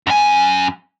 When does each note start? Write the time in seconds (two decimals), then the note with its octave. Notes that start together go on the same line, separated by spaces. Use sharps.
0.07 F#2 G#5